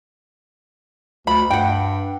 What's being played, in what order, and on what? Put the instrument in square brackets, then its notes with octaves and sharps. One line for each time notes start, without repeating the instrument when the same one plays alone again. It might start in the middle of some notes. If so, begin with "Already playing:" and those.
[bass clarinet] D2 [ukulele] B5
[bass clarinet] G2 [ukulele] F#5 G5